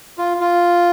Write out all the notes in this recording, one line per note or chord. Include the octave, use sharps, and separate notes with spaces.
F4
F4